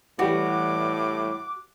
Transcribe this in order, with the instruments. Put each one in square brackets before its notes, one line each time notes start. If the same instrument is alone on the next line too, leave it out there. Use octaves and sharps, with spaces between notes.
[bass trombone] A2 [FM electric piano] E3 G3 [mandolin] F#4 [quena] D6